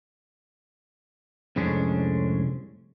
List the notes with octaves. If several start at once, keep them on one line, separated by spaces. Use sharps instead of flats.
C2 F2 A2 G#3 C#4 D4